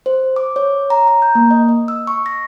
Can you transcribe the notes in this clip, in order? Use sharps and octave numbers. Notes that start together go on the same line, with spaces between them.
C5
D6
C#5
A#5
A#5
G6
A#3
D#5
D#5
E6
C#6
A#6